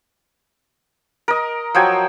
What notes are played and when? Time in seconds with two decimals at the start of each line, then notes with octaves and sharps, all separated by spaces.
1.28 A#4 D#5
1.75 F3 F#3 G5 G#5